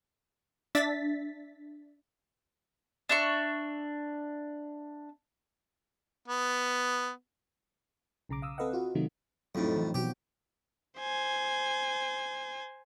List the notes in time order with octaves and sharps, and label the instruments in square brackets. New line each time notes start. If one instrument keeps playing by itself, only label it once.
[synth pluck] D4 E5 A6 B6
[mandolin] D4 E5 C#6
[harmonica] B3
[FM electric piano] B1 C#3 A#5 D6
F5 D#6 E6
C4 A4 B4 D#5 F5 F#5
F4 F#4
C3 D#3 F#3 A3 D#4
[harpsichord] F2 A2 [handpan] F#3 C4 D#4
[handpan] E3
[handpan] B2 F3 F#4 [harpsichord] G4
[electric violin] C5 G#5